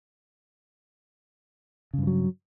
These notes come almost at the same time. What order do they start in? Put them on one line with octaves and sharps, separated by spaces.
C#3 G2 E3 F#3